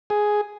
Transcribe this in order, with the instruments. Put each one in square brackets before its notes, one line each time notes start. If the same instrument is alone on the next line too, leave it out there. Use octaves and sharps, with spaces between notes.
[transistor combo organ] G#4